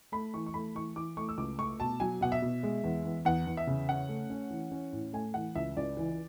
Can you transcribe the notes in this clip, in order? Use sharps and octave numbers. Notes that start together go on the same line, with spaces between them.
A3 B5
E3 C#6
C#6
A3 B5
E3 C#6
E3 D6
A3 C#6
E6
C#2 D6
A3 C#6
B2 A5
F#3 G#5
B2 F#5
E5
B2
G#3
E2
E2
E2 F#5
E2
E5
C#3
C#4 F#5
A3
C#4
E3
C#4
A2
A3 G#5
E3 F#5
C#2 E5
C#2 D5
E3